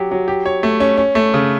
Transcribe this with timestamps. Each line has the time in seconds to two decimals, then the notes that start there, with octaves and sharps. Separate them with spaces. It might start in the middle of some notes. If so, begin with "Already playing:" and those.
Already playing: F#3 G4
0.11 F#3
0.28 G4
0.46 C#5
0.63 A3
0.80 C#4
0.97 C#4
1.15 A3
1.34 C#3